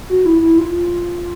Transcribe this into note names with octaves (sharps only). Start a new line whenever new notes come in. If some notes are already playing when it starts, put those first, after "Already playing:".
F#4
E4
E4
F4